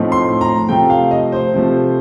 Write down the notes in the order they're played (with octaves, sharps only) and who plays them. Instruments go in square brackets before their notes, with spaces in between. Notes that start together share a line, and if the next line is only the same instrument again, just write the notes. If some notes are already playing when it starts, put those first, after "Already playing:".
Already playing: [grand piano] A2 F3 A3 C4 D#4
C6
A#5
C3 F3 A3 G5
F5
D#5
C5
C3 F3 A3